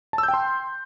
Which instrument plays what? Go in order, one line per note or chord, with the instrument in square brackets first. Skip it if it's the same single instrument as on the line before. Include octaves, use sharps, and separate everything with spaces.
[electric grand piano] A5
E6
G6
G5
C6